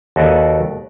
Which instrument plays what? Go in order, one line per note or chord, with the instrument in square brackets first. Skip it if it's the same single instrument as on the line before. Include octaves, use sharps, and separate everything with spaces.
[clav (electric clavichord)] D#2 F#4 A4 B4 D5